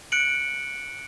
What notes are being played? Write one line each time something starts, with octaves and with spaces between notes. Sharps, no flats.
F#6 C#7 D7 F#7